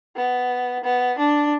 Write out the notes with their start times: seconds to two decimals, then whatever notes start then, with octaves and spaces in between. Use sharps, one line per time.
0.16 B3
0.83 B3
1.18 D4